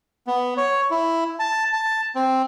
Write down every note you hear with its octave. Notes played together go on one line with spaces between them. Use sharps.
B3
C#5
E4
A5
A5
C4